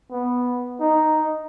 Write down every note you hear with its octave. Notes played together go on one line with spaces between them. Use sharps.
B3
D#4